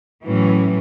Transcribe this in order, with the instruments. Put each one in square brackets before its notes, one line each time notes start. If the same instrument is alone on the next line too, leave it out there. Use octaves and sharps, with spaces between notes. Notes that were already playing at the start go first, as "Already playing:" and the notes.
[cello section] A2 E3 F#3 C#4